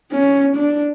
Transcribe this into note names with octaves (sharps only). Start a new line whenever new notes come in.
C#4
D4